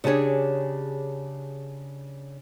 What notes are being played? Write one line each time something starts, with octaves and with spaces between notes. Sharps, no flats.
C#3 D4 G4 G#4 C#5